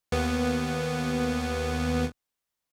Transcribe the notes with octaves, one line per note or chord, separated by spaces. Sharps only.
D#2 B3